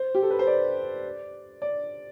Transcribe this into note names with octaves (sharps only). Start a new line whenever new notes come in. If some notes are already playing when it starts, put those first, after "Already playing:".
Already playing: C5
G4
A4
B4
C5
D5
D5